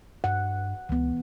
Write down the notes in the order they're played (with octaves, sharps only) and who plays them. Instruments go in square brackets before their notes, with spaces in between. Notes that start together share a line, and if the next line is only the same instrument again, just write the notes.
[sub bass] G2 [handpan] F#5
[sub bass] C#2 [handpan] E3 B3